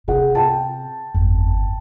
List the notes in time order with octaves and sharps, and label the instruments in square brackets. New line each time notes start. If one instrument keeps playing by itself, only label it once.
[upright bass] C3 [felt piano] G#4 F#5
[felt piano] G5 A5
[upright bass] G1 [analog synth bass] F2